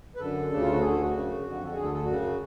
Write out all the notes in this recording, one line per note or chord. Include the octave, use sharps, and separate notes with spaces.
B4
F#2 D3 A4
D2 C#3 D4
F4
F#4
D2 D3 G#4
A4
F#4
F#2 C#3
F2 D3
A4
D2 D3 G#4
A4
A4
F#2 C#3 F#4